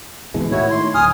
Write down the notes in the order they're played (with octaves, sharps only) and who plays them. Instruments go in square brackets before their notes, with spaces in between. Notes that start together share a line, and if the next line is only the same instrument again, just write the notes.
[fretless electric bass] B2 E3 G#3
[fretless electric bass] A2 D#3 [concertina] E4 F#4 C#5
[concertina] C6
[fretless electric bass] D1 [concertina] G#5 D#6 F6